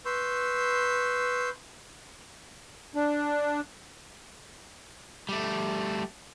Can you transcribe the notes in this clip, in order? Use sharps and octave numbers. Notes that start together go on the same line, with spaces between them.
B4 C6 C#6 E6 G6
D4
G3 A3